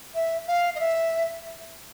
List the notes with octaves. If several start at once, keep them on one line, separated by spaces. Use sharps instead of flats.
E5
F5
D#5
E5